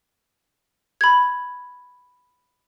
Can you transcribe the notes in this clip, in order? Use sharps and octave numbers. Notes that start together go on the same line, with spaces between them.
B5 G#6